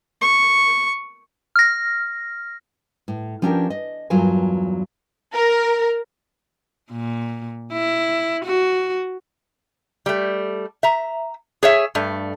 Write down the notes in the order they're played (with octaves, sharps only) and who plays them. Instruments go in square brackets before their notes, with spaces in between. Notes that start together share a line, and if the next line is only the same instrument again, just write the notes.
[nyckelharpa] C#6
[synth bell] F6 A#6
[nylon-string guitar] A2
F3 C#4 D4 G4 A#4
D#5
E2 G2 F#3 F4 A#4 G#5
[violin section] A#4
[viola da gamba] A#2
E4
F#4
[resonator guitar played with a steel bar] G3 A3
E5 A#5
G#4 C#5 E5
G2 A3